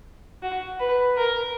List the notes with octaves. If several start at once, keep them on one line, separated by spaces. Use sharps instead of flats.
F#4
B4
A#4